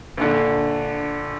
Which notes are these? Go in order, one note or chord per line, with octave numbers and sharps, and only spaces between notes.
A#1 D3